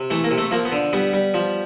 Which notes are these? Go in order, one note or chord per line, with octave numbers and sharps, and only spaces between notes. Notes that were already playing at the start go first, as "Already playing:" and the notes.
Already playing: C3
E3 A3
A#3
C3
A3
F3 A#3
B3
D3
G3 B3
G3
F3